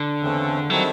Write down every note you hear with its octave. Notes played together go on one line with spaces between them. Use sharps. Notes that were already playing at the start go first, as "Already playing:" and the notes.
Already playing: D3
E2 C#3 E3 A3 C4
D#3 F#3 G3 C4 E4 A4